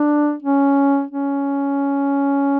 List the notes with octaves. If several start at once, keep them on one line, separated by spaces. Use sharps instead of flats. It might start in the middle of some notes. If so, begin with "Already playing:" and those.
Already playing: D4
C#4
C#4